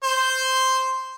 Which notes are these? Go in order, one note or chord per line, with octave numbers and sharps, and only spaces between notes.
C5